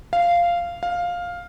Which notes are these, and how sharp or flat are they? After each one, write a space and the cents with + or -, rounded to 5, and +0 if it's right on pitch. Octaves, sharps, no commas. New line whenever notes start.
F5 -10
F5 +10